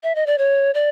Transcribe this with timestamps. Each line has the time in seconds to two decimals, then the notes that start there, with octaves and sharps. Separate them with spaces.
0.03 E5
0.15 D#5
0.26 D5
0.38 C#5
0.74 D5